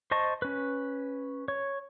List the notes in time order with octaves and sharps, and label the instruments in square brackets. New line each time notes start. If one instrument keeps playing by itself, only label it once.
[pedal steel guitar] C5 D#5 A5 C#6
C#4 B4
C#5